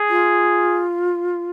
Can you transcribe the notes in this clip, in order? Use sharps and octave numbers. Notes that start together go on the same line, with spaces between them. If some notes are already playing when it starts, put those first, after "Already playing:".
Already playing: G#4
F4